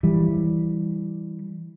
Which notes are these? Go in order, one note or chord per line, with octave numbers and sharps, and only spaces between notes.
E3 G3